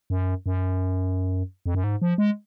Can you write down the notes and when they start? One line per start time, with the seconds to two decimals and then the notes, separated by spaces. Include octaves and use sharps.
0.10 F#2
0.46 F#2
1.66 F2
1.75 F#2
1.84 G#2
2.02 F3
2.18 G#3